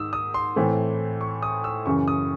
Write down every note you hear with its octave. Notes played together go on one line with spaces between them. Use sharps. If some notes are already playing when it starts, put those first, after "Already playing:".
Already playing: G#2 D#3 D#6 E6
D#6
C6
A2 E3 A3 C4
C#6
D#6
E6
F#2 C#3 E3 C#6
D#6